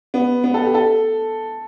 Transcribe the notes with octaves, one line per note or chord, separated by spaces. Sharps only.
B3
B3
A4
G4
A4